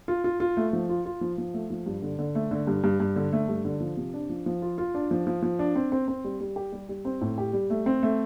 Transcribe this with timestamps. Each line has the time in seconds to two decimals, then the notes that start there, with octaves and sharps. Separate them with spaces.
0.08 F4
0.24 F4
0.40 F4
0.57 A3
0.73 F3
0.89 F4
1.05 F4
1.21 F3
1.38 F3
1.54 A3
1.70 F3
1.86 G2
2.02 D3
2.19 D3
2.35 A3
2.51 D3
2.67 G2
2.84 G2
3.00 G2
3.16 D3
3.33 A3
3.48 G2
3.65 D3
3.80 F3
3.97 C3
4.14 D4
4.30 F3
4.46 F3
4.62 F4
4.78 F4
4.94 D4
5.11 F3
5.27 F3
5.42 F3
5.59 D4
5.76 C4
5.92 C4
6.08 C4
6.24 G3
6.41 G3
6.56 G4
6.72 G3
6.89 G3
7.05 C4
7.21 A2
7.38 G4
7.53 G3
7.70 A3
7.86 C4
8.03 A3